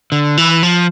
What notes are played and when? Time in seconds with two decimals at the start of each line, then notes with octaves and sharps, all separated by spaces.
0.12 D3
0.37 E3
0.63 F3